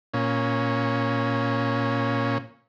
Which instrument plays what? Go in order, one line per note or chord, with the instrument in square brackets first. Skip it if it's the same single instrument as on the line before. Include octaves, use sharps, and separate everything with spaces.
[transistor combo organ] A#2 C#4